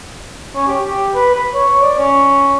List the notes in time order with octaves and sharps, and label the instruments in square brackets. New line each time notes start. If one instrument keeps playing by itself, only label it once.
[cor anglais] C#4
G4
G4
B4
B4
C#5
D5
C#4